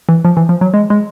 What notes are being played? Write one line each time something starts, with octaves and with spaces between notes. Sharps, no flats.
E3
F3
E3
F3
F#3
G#3
G#3